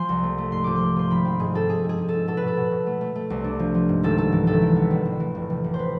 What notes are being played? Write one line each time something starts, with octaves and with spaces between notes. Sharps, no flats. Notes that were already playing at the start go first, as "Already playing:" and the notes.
Already playing: F3 G#5 C6
C2
A3
A3
G#2 C6
F3 D6
C6
F3
F3 C6
G#1 B5
C4
G#2 G#4
C4 A4
G#2 G#4
G#2
G#4
G#2
G#2 A4
B2 A4
B4
B2
A4
B2
B2
A3
A3
A3
C2
D4
F3
F3
G#2
G#1 A4
G#2 A4
E3
G#1 A4
E3
B3
A1
A1
E3
F1
F1
F1
C5
B4